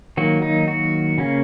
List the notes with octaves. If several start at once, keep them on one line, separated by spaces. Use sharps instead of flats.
D#3 F#3 A#3 F#4
D#4
F#4
C#3 A#3 C#4